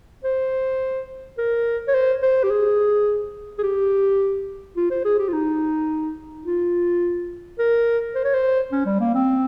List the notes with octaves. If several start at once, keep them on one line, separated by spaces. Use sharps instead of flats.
C5
A#4
C#5
C5
C5
G4
G#4
G#4
G4
F4
C5
G#4
G4
F4
D#4
F4
A#4
C5
C#5
C5
C#4
G3
A#3
C4